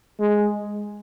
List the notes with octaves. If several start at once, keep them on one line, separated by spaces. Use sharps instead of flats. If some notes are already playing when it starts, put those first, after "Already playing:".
G#3